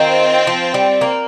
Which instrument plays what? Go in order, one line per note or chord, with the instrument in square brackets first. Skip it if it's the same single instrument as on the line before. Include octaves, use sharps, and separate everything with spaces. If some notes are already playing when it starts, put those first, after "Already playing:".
Already playing: [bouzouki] D#3 [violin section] C4 F4 C5 G5
[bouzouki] F3
G3
A#3